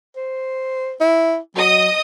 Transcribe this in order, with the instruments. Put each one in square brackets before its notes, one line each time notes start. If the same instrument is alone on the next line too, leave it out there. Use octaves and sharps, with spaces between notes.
[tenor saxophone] C5
E4
[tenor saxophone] F#3 [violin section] D#5 D#6